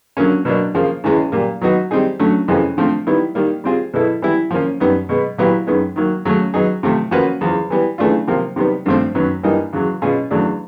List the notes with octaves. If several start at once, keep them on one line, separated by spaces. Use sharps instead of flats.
D3 F#3 A#3 C#4
B2 F#3 A#3 D4
C#3 F3 A#3
E2 C#3 E3 G#3 C#4
A#2 G3 A#3
F#3 B3 D#4 F#4
G3 C4 D#4 G#4
D3 F#3 A3 C#4
F2 C3 E3 G#3 C#4
D3 F3 A3 C4
D#3 G3 B3 E4
D#3 G3 A#3
G3 C4 F4 G#4
B2 G#3 B3 E4 A4
E3 G3 B3 E4
F3 A#3 C#4
F#2 D#3 G3 B3
B2 G#3 B3
A#2 F#3 B3 E4 G4
F#2 D#3 G#3 B3
D#3 F#3 A#3
C#3 F#3 A3 C#4
F#3 B3 D#4 G#4
C3 F3 A3
F3 A#3 C#4 F#4 B4
E2 C#3 F3
E3 G3 B3
C#3 E3 A3 D4 F4
C3 F3 A#3
C3 D#3 G3 B3
G2 D3 F3 A3 C4
F#2 D#3 F#3 B3
G2 E3 G3 A#3 D#4
E2 C#3 F#3
B2 G#3 C#4 F4 G#4
E2 C#3 F#3 A3 D4